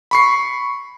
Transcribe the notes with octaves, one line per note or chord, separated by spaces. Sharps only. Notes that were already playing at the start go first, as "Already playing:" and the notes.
B5 C#6 C7